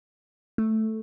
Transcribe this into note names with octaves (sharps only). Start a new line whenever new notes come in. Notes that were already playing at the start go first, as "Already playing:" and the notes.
A3